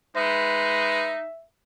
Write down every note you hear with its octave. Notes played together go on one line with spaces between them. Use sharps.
G#3 D#4 B4 E5